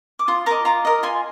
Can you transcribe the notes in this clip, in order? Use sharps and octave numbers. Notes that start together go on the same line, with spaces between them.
D6
F4 C6 D#6
A#4 D#5 A#5 D6
F4 A#5 D6
A#4 D#5
F4 G#5 C6